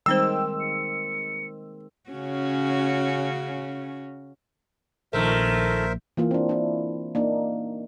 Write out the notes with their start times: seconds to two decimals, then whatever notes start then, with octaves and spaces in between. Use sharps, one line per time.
0.06 D#3 G3 G#3 C4 D#4 C5 G5 E6
0.60 C#7
2.10 C#3 C#4 F#4
5.13 A#1 D#3 A3 A#4 C5 E5
6.17 E3 A#3 F4
6.31 C4 D4
6.49 D4 E4
7.15 A#3 D4 D#4